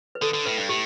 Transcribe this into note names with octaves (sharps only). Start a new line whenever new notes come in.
B4
D3 A4
D3
A2 B4
G2
A2 G4